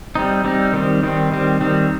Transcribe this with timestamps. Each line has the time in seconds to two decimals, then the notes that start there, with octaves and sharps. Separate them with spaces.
0.15 G3 C4 D#4
0.44 G3 C4 D#4
0.73 D#3 G3 C4
1.03 D#3 G3 C4
1.32 D#3 G3 C4
1.61 D#3 G3 C4